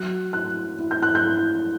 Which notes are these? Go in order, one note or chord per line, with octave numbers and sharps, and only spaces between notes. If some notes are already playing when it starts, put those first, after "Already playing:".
Already playing: F#3 F#6
E4 F#6
E4
G6
F#6
G6
E4